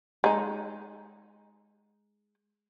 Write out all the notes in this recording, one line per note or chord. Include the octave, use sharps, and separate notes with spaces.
G#3 D#4